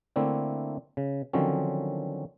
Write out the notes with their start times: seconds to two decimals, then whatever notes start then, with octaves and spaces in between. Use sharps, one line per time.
0.16 D3 A3 A#3 C4 D4 E4
0.97 C#3
1.33 D3 D#3 F3 F#3 C4 C#4